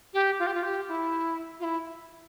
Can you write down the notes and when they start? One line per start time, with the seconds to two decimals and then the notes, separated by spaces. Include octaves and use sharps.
0.13 G4
0.39 F4
0.47 G4
0.54 F4
0.63 G4
0.88 E4
1.60 F4
1.64 E4